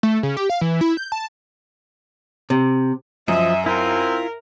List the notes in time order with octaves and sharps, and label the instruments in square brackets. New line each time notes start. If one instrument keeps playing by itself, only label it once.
[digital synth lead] A3
C#3
G4
F5
E3
E4
G6
A5
[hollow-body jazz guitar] C3
[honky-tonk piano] F#2 [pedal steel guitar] F3 [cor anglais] D#5 [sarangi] E5
[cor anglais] C4 [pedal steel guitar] E4 F4 [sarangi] A#4